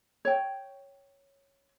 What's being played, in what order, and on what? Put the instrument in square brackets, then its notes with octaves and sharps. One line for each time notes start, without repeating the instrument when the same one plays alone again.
[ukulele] C#5 G5